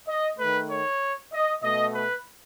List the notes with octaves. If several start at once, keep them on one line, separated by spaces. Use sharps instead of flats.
D#5
D#3 A3 B4
C#5
D#5
B2 A3 D#5
B4